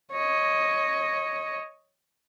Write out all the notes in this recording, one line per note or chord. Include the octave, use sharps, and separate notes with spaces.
C#5 D#5